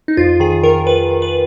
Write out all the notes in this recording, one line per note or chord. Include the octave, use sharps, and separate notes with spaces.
D#4
F2 F4
D#3 G#4
D#3 A#4
D#3 B4
D#3
B4